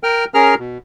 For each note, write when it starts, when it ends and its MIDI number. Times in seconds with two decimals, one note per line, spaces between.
0.03 0.25 70
0.03 0.25 79
0.03 0.25 89
0.34 0.55 61
0.34 0.55 68
0.34 0.55 70
0.34 0.55 82
0.34 0.55 89
0.59 0.78 47